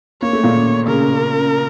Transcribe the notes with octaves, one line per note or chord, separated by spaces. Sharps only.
A#3 C#5
A3
A#2 A#3
C#3 C#4 A#4